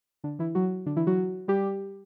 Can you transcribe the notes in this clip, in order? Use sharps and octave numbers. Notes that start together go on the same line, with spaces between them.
D3 D4
E3 E4
F#3 F#4
D3 D4
E3 E4
F#3 F#4
G3 G4